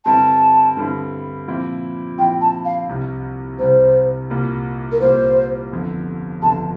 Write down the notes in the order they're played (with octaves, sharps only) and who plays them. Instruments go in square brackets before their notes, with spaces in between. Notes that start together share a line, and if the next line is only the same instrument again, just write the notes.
[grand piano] G2 D3 G3 C4 E4 [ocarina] A5
[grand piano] G2 D3 G3 C4 E4
A#2 F3 C4 E4
[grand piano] A#2 F3 C4 E4 [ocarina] G5
[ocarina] A5
F5
[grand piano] C2 C3 G3
[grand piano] C2 C3 G3 [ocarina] C5
[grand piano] C2 A#2 G3 A#3
[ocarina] A#4
[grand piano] C2 A#2 G3 A#3 [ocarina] C5
[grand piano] G1 F2 D3
[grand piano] G1 F2 D3 [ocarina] A5